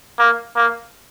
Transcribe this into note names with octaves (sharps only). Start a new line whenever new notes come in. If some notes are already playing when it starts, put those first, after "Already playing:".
A#3
A#3